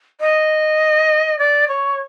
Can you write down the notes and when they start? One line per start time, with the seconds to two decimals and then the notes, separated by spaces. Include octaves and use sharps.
0.20 D#5
1.39 D5
1.68 C#5